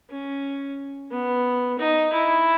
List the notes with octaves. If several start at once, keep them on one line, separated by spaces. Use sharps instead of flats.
C#4
B3
D#4
E4